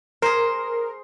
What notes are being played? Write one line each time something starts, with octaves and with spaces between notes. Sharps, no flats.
G#4 A#4 C5